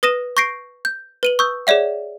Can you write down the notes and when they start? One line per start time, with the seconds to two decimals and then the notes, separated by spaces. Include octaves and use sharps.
0.03 B4 D#6 A#6 D#7 E7
0.37 C#6 G6 A#6 C7 D7
0.85 G6
1.23 B4 D#7 F#7
1.39 C#6 D#6 E6 G6
1.67 G#4 C#5 D5 E5 F#5